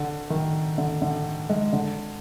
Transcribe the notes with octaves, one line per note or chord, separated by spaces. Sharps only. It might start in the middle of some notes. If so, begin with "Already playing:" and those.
Already playing: D3
D#3
D3
D3
G#3
D3